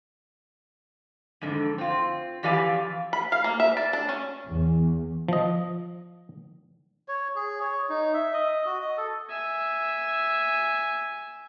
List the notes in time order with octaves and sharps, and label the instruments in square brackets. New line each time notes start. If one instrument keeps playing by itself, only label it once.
[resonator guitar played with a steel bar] F2 G#2 D3
C4 F4
F2 E3 G4 D5 F5 G#5
[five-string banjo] B5
F5
A#3
E5
D5
D4
C#4
[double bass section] E2
[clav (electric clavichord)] F3 D#5
[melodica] C#5
G#4
C#5
D#4
E5
D#5
F#4
D#5
A4
[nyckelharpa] E5 G#5